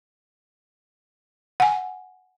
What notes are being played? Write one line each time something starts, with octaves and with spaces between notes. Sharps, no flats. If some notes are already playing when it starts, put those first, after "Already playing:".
F#5 G#5